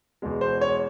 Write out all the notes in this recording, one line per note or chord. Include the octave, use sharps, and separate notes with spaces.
E2 B2 G#3
C5
C#5